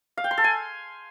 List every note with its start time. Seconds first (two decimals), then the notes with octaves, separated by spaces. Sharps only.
0.17 F5
0.24 G5
0.31 C6
0.38 A4
0.44 G#5